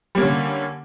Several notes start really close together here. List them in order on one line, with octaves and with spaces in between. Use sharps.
G3 A#3 C#4 D3